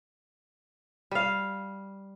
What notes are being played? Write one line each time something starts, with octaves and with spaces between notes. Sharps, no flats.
G3 F5